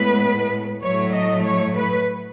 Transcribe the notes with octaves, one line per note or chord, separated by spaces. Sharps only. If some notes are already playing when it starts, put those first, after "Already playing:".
Already playing: A2 G#3 B3 B4
A2 F#3 A3 C#5
D#5
C#5
B4